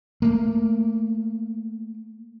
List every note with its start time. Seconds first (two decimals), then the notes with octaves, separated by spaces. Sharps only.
0.22 A3 A#3